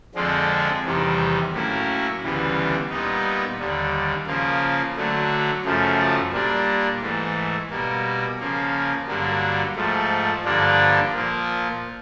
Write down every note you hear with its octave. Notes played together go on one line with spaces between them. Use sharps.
F2 D3 F3 G#3 C4
E2 C3 D#3 G3
A2 F#3 A#3 C#4 E4
D2 C#3 E3 G3 B3
A#2 G3 B3 D#4
D#2 D3 G3
C#3 F3 A#3
D3 F#3 A3
F#2 C#3 F3 A3
A#2 G3 A#3 D4
G#2 E3 A3
B2 G3 A#3
C#3 F3 A#3
G2 D3 F#3 A#3
G#2 F3 A3
G2 D3 F3 A#3 D4
A#2 F3 A#3